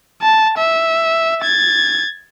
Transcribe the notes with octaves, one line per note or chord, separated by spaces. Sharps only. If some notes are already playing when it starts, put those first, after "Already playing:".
A5
E5
G#6 A6